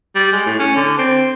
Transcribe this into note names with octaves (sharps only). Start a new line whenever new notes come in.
G3
G#3
A2
C#4
D3
C4